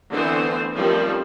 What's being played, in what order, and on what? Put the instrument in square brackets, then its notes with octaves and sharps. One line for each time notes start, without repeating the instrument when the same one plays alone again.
[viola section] D3 E3 A3 B3 C4 C5
D#3 F3 G3 A3 C4 C#4